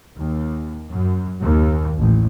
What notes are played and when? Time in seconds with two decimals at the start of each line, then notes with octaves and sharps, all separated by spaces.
0.16 D#2
0.90 F#2
1.41 D#2
1.98 A1